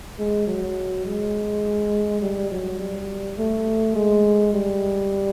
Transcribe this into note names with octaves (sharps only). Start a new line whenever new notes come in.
G#3
F#3
G#3
G3
F#3
G3
A3
G#3
G3